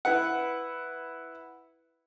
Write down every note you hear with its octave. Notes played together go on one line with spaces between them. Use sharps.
E4 B4 F#5